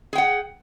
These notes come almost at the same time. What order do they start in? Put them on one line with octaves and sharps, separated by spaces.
G#4 G5 F#5